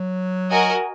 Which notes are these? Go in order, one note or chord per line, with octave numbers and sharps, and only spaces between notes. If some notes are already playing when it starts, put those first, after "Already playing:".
Already playing: F#3
F#4 A#4 D#5 G#5